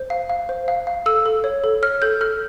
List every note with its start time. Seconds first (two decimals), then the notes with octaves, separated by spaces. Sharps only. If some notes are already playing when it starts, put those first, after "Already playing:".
Already playing: C5
0.10 F5
0.29 F5
0.49 C5
0.68 F5
0.87 F5
1.06 A4 E6
1.26 A4
1.44 C#5
1.64 A4
1.82 C#5 F6
2.02 A4 G6
2.21 A4 F6